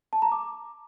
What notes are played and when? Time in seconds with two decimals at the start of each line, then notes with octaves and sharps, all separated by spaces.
0.13 A5
0.22 A#5
0.32 D6